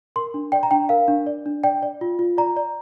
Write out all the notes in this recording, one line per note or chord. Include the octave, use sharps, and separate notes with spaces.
A#4 C6
D4
D5 G5
A#5
D4 G5
A#4 F5
D4
D5
D4
D5 G5
D5
F4
F4
D5 A#5
D5